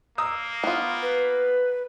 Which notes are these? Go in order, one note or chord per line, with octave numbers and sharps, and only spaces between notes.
A#3 A#5 D#6 E6
B3 F4
B4